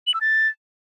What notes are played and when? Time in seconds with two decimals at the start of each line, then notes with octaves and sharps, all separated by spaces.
0.07 F#7
0.14 E6
0.21 A6